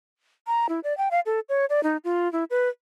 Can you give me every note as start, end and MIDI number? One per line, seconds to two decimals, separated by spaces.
0.47 0.67 82
0.69 0.80 64
0.84 0.96 74
0.98 1.09 79
1.11 1.20 77
1.26 1.40 69
1.49 1.65 73
1.70 1.83 74
1.83 1.97 63
2.04 2.31 65
2.32 2.44 64
2.50 2.69 71